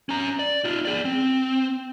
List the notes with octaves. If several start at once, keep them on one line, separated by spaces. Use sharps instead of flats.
C#4 A#5
D5
D#4 F4
G#4 D5
C4